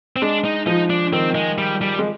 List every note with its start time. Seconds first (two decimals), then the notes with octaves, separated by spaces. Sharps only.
0.16 C4
0.22 G#3 D4
0.45 D#4
0.66 F3 D#4
0.90 D4
1.12 D#3 C4
1.35 G#3
1.58 G3
1.81 G3
1.99 G#3